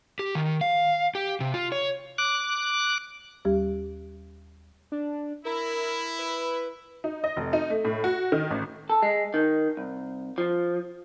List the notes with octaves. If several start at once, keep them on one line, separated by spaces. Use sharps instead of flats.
G4
D#3
F5
G4
C3
F4
C#5
D6 F#6
D#2 G3 G4
D4
E4 A#4
B4
D#4
D#5
F1
D#4
A3
A2
F#4
D#3
A1
A4
G#3
D#3
C2
F3